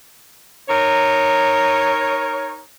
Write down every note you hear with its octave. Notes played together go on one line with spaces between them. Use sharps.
D#4 A#4 C#5